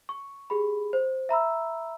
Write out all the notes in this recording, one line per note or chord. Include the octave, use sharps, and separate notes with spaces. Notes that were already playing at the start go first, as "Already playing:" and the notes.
C#6
G4 G#4 B5
C5
E5 A#5 B5 E6